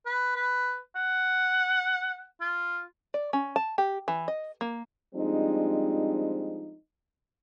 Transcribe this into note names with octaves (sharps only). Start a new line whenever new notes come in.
B4
B4
F#5
F4
D5
C#4
A5
G4
E3
D#5
A#3
F3 G3 G#3 C4 D4 D#4